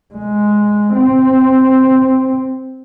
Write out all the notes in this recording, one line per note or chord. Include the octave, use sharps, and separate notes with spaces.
G#3
C4